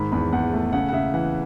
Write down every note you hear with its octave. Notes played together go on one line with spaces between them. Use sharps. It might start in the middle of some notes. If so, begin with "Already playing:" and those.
Already playing: G#2 D#3 B5
E2 B5
E2 F#5
A3
C#3 F#5
F#5
C#3 E5
E3 F#5